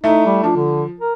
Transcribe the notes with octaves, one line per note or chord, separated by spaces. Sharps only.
A3 D#4 E4
G3
F3 D4
D3
A#4